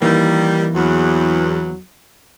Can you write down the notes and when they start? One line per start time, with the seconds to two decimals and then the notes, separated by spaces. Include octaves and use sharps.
0.02 D#3 E3 G3 A#3
0.74 E2 F#3